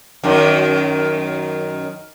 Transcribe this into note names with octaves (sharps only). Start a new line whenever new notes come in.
F#2 D#3